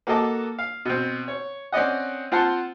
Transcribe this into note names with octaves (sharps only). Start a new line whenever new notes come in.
A#3 F#4 A4 D#5 A5 D6
F5
B2 C4
C#5
C4 C#4 D5 D#5 F#5
C4 F4 F#5 A5 C6